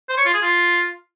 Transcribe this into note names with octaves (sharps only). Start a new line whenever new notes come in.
C5
C#5
F4
G#4
F4